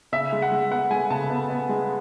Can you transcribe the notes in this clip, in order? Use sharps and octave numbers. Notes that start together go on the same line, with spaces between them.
C#3 E5
G#3
F#5
G#3
B3 F#5
G#3 G#5
C#3 A5
B3
B3
G#3